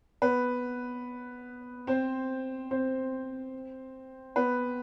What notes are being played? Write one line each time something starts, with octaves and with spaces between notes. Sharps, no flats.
B3 B4
C4 C5
C4 C5
B3 B4